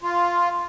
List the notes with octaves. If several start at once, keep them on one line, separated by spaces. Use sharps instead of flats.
F4